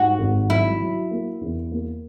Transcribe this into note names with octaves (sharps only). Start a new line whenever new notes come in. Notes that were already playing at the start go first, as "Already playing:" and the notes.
Already playing: G#2 F#4
G#1
F#3 E4
F#3
A#3
E2
A#3